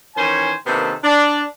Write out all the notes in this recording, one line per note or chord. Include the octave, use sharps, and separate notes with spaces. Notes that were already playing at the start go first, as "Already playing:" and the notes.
D#3 E3 C#4 C5 G#5
C3 D#3 A#3 B3 D4 A4
D4